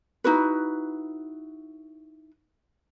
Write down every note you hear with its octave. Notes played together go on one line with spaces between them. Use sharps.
D#4 E4 F#4 B4